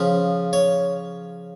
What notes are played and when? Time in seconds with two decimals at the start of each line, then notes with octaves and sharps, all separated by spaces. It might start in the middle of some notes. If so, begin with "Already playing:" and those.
Already playing: C#3 F3
0.53 C#5